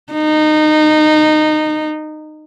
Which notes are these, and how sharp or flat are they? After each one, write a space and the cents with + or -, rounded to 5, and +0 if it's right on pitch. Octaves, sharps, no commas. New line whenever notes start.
D#4 -20